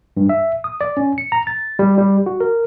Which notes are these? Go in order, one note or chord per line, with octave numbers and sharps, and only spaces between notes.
G2
E5
D#6
D5
C#4
C#7
A#5
A6
G3
G3
F#4
A#4